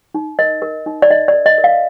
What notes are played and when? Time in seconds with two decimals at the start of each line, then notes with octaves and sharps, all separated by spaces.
0.15 D#4
0.39 A#4 D#5
0.62 A#4
0.86 D#4
1.02 D5
1.10 D#4 D#5
1.28 D5
1.33 A#4
1.46 D#5
1.58 A#4
1.64 F5